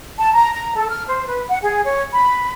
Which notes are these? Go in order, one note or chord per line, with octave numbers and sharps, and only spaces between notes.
A5
A#5
A#5
A4
F6
C5
B4
F#5
G#4
C#5
B5